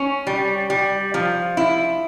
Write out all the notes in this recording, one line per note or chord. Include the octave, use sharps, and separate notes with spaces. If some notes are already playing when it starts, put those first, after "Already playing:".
Already playing: C#4
G3
G3
F3
E4